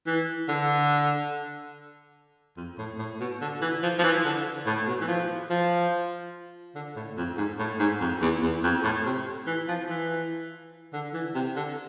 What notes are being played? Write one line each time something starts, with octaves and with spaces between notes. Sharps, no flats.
E3
D3
F2
A2
A2
B2
D3
E3
F3
F3
E3
D3
A2
B2
E3
F3
F3
D3
A2
F2
G#2
A2
G#2
F2
E2
E2
F2
A2
C3
E3
F3
E3
D3
E3
C3
D3